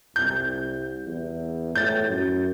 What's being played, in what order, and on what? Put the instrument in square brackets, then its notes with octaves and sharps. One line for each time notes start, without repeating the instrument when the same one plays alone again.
[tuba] C2 [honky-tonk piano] G6
[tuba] E2
[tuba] A2 [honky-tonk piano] G6 A6
[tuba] F#2